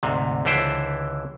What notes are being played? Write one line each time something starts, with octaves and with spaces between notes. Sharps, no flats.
D2 G#2 C3
C#2 D3 E3 E4 C5 G5